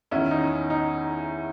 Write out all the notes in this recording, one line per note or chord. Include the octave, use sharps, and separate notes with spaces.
E2 D#3 C#4 E4
D#4
D#4